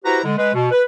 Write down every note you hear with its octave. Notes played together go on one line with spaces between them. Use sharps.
E4 F#4 G4 B4 C5 A#5
D3 G#3
G#3 B4
B2
B4